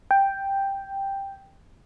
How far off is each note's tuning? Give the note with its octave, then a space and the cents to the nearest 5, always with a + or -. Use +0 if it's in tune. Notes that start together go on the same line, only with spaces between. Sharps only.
G5 +0